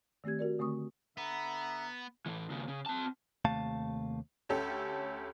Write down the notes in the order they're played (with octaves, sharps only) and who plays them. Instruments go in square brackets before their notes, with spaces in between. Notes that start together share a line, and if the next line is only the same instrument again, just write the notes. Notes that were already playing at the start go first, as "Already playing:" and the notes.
[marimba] D#3 A3 C4 G4 G#6
F#4 A#4 D5
D3 A3 C4 C#6 D#6
[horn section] D3 E5 A#5 [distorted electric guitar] B3
[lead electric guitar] A2 E3
D#2 C#3
C#3
C4 A5
[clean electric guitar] D#2 C3 A3 F5 A5
[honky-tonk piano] D2 C#4 G4 A4